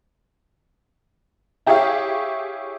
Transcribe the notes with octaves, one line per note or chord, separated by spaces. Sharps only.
E4 G4 G#4 C#5 E5 F5